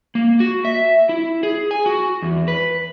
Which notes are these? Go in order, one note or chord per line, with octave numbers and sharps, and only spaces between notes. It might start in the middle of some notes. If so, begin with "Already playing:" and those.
A#3
F#4
E5
E4
G#4
G#5
F#4
E2
B4